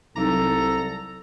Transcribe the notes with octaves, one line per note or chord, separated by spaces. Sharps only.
C2 F#3 D#4 A4 A#5 D6